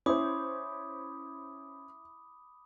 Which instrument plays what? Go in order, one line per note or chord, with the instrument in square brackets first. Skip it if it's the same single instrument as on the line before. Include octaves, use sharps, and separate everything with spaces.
[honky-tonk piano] C#4 C5 [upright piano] E4 [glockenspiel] B5 D6 D#6